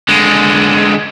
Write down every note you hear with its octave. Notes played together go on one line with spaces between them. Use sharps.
D3 G#3